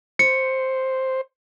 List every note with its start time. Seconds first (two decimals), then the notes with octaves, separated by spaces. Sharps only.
0.19 C5 C#7